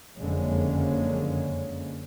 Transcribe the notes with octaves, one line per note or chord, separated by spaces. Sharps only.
F#1 F2 D3 G#3 A#3 C#4